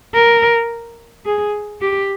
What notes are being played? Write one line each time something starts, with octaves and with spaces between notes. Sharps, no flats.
A#4
G#4
G4